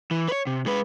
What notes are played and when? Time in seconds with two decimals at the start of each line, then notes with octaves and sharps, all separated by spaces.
0.11 E3
0.28 B4 C#5
0.47 C3
0.66 G#3 B4